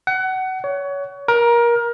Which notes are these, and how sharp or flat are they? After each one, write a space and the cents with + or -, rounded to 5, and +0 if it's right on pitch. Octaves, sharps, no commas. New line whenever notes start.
F#5 +25
C#5 +25
A#4 +20